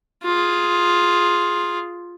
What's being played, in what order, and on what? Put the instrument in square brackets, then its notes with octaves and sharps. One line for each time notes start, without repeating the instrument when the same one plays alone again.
[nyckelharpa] F4 G#4